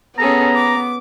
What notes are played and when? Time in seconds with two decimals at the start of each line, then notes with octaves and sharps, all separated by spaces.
0.18 B3 C#4 G#4 A4 A#5
0.55 D6